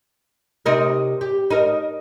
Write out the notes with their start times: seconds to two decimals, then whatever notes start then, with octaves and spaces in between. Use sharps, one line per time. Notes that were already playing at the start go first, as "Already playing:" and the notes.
0.66 C3 D#4 A#4
1.21 G4
1.50 D#4 A#4